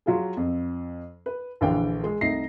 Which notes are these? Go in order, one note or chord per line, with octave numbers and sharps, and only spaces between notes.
F#3 F4 G#4
F2
B4
A#1 D3 E3 A#4 F5 G5
G#3
C2 A3 D#4 E5 A#6 C7